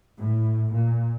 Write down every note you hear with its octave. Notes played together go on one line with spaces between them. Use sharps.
A2
A#2